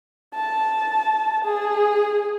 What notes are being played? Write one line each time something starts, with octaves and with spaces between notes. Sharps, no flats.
A5
G#4